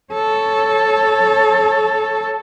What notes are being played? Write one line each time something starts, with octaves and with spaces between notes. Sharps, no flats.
A4 C#5